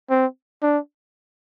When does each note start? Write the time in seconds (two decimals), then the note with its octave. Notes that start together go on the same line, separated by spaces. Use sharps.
0.10 C4
0.62 D4